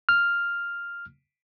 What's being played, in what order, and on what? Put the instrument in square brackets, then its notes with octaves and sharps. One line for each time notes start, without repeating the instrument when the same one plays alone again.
[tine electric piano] F6